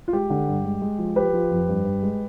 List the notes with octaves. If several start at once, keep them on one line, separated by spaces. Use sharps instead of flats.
F4
G#3 G4
D3
G2
G#3
G#3
F3
F3 G4 B4
F3
F2
G2
G2
G#3